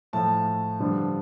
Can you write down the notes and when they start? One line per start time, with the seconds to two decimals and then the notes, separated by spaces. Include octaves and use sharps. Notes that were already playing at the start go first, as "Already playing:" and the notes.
0.13 A2 F3 A3 A5
0.80 G2 D3 F3